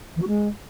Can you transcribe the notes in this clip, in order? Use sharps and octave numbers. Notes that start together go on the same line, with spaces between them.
E3
F#4
G#3